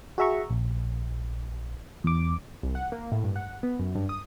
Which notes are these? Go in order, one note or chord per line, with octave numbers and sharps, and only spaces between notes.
F#4 G#4 E5 A#5 C#6
A#1
E2 D6
C2
F#5
A#3
A2
G2
F#5
B3
F#2
G2
D#6